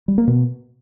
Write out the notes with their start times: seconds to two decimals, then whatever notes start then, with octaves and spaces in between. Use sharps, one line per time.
0.08 G3
0.18 A#3
0.27 B2